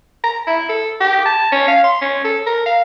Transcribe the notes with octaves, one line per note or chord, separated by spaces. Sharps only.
A#5
E4
A4
G4
A5
C#4
F5
C6
C#4
A4
A#4
F5